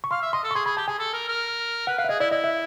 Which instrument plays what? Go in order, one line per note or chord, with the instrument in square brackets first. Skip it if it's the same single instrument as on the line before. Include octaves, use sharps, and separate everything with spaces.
[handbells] C#6
[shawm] F5 [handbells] C6
[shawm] E5
[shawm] D#5 [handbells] C6
[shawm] A4
[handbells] C#6
[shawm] G#4 [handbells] C6
[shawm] G#4 [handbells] B5
[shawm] G4 [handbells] A5
[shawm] G#4 [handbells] G#5
[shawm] A4
A#4
A#4
[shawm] B4 [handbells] F#5
[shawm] B4 [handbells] F5
[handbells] E5
[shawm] G#4 [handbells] D#5
[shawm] E4 [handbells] D5
[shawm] E4 [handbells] D#5
[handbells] E5